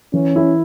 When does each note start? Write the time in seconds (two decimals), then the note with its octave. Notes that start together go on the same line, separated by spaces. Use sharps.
0.13 E3 C#4
0.36 E4